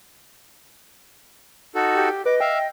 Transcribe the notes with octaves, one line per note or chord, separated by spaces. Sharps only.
D#4 F#4 A4
G4
B4 D#5 D6
E5 F5 G5